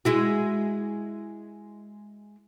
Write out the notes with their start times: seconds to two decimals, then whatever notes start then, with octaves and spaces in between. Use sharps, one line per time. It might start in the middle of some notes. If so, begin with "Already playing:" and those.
0.05 G#3 E4 F#4